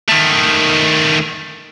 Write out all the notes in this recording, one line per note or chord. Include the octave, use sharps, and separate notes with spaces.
D#3 A3